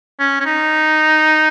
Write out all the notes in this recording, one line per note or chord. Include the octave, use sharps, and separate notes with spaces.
C#4
C#4
D#4